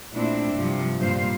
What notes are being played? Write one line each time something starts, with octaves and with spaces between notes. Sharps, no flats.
A#2 A3 C4 D4 E4
G2 C3 F3
G2 A#2 C5 F5